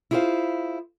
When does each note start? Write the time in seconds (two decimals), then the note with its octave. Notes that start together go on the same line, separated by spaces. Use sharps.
0.11 E4 F4 G#4 A4 C5 F5